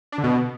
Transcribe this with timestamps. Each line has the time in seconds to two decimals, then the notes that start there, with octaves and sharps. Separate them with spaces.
0.12 D4
0.18 D3
0.24 B2